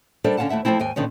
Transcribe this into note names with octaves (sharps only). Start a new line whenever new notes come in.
G3 D4 A4 A#4 C5 E5
D3 C#4 F4 F5 F#5 A5
D#2 A3 E4 E5 F#5
F3 G#3 A3 C4 E4
D#2 G#2 G5 G#5
A#2 D3 D#3 B3 C#4